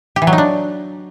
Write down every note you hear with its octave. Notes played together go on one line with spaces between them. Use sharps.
G4
E3
F#3
D#4
D4